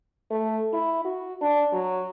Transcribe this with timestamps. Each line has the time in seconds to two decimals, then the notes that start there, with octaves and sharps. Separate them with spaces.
0.31 A3
0.73 E4
1.05 F#4
1.41 D4
1.73 F#3